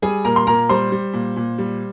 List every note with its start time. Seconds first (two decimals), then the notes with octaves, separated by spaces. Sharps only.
0.02 G3 G#4 G#5
0.25 A#2 A#4 A#5
0.36 C6
0.47 A#2 A#4 A#5
0.69 G3 C5 C6
0.92 G3
1.13 A#2
1.36 A#2
1.58 G3